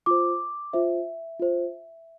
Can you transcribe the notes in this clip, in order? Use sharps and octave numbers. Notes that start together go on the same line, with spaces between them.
F4 C5 D6
F4 C5 E5
F4 C5